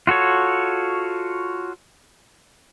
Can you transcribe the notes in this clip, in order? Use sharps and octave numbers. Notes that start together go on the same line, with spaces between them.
F4 F#4 A4 C#5